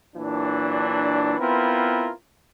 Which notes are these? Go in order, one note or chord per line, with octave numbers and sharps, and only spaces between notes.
A#2 E3 F#3 D4
B3 C4 E4 F4 A#4 B4